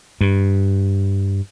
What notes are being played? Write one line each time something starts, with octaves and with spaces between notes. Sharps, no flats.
G2